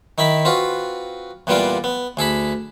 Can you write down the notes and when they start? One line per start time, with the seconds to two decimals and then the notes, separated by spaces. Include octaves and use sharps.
0.18 D#3 D#4 E4 B5
0.45 C4 F4 F#4 B4
1.47 E2 A#2 G3 B3 F4 D5
1.84 B3
2.17 D2 G#4 A4 B5